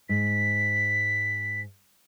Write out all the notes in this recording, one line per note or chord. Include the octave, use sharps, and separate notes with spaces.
G#2 B6